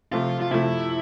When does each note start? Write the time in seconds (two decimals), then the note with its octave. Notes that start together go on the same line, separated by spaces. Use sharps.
0.12 C3 F3 A3 F4
0.41 F4
0.51 C3 F3 A3 E4